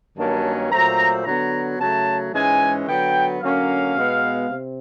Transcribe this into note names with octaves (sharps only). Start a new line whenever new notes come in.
G2 D#3 F#3 A#3 C#4 A5
A#2 F#3 A3 C4 A#5
D3 F#3 B3 A#5
C#3 F#3 A3 A5
G#2 E3 G#3 C#4 G#5
D3 F#3 B3 G5
D3 F#3 A#3 C#4 F5
B2 G#3 B3
C3